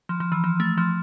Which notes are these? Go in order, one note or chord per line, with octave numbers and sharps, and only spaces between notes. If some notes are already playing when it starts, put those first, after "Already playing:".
F3
F3
E3
F3
A3
F3